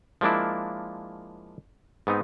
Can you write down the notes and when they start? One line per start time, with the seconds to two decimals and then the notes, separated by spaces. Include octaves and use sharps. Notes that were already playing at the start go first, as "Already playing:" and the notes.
0.21 F3 G#3 A#3 D4 E4
2.07 G#2 B3 C4 D#4